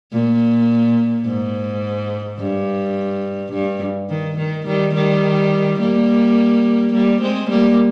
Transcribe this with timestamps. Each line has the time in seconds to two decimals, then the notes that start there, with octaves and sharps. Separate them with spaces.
0.12 A#2
1.26 G#2
2.39 G2
3.53 G2
4.09 D#3
4.38 D#3
4.66 D#3 G3
4.94 D#3 G3
5.80 G3 A#3
6.93 G3 A#3
7.21 G#3 C4
7.50 G3 A#3